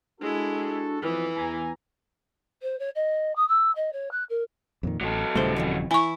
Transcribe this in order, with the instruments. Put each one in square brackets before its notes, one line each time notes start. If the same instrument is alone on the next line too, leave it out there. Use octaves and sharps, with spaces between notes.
[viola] G#3 E4 [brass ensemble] D4 F#4 A4
[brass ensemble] F2 B3 [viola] E3
[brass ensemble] E2 G#5 A#5
[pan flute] C5
C#5
D#5
D#6
E6
D#5
C#5
F#6
A#4
[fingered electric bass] F2 A#2 D#3
[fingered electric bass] A1 [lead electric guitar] F#3 A4
[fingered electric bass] D#1 C#3 G3 [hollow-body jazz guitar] A2 A3 C5
[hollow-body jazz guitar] F2 G#2 E3
[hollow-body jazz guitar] E3 E4 [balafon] G#5 C#6